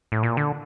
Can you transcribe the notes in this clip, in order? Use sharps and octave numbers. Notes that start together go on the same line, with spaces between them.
A2
A#2
D3